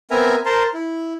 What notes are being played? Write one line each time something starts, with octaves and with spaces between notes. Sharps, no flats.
B3 C4 A#4 E5 G#5 A#5
A#4 C5 A5 A#5 C6
E4